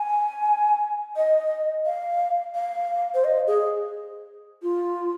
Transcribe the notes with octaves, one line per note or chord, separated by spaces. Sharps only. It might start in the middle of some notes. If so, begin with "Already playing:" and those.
Already playing: G#5
D#5
F5
F5
C5
D#5
G#4
F4